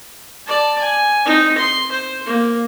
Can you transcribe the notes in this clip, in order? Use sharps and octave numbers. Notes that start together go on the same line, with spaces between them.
D5 A5
G#5
C4 D#4
C6
C5
A#3